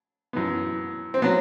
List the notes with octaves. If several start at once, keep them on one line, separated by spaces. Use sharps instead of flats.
F#2 E3 B3
C4
F#3 B3